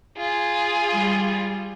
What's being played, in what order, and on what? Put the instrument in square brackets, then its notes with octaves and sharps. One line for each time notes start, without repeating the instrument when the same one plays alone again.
[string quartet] F4 G#4
[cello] G3